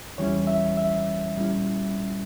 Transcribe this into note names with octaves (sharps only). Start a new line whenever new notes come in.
E2 E3 G3 C#4 E4 C#5
E5
E5
A#2 G3 C#4 E4